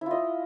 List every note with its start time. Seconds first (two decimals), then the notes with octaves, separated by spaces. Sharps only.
0.01 E4
0.06 F4
0.11 D#5